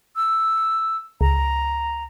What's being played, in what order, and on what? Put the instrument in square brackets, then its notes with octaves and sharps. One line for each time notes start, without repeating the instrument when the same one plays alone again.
[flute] E6
[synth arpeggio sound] C#2 [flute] A#5